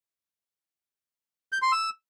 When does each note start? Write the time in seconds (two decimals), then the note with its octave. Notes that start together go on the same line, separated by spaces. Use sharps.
1.52 G6
1.62 C6
1.72 E6